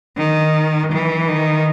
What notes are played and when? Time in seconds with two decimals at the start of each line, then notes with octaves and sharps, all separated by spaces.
0.17 D#3
0.92 E3
1.28 D#3